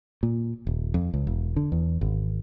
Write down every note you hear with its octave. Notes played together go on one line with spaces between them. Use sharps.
A#2
D#1
F2
C#2
E1
D3
E2
G#1